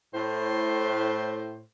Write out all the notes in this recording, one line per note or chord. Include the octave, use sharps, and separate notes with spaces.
A2 C5